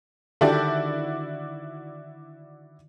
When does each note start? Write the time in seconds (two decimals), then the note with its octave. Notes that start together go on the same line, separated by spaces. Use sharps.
0.41 D3 D#3 D4 E4 F#4 G4 A4 D5